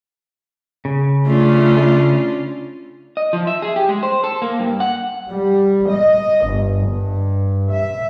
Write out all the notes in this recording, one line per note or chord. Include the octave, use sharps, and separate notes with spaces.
C#3
A3 C#4 D4 F4
D#5
F3
E5
G#4
G4
G#3
C5
A4
A#3
G2
F#5
G3
D#5
G1
G2
E5